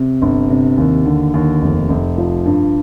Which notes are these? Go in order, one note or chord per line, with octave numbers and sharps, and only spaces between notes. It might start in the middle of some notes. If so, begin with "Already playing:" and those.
Already playing: C3
G1
C3
D#2
D3
D#2
F1
F1
F3
G2